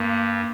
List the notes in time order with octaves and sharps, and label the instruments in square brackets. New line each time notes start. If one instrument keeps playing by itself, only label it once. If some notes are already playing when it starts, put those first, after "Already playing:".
Already playing: [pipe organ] G2 [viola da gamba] A#3